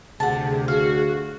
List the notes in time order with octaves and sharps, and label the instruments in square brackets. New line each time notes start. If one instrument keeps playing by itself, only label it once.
[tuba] D2 [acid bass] C3 [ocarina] G#4 [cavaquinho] F#5 A5
[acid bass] F#4 [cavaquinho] F5